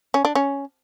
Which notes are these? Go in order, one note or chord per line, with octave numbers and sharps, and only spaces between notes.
C#4
D4
C#4